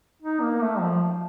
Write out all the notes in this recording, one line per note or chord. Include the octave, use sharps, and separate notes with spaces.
D#4
A#3
A3
F3